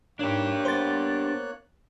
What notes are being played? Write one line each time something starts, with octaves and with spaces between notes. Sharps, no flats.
G#2 A#3 D4 G4 C#5 F#6
B3 C5 A6